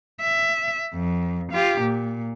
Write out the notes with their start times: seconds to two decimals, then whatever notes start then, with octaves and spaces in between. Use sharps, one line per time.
0.21 E5
0.94 F2
1.52 F4 G4
1.81 A#2